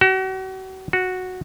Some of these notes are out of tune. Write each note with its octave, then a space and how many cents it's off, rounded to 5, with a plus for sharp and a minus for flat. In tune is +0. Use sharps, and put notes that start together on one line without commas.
F#4 +40
F#4 -5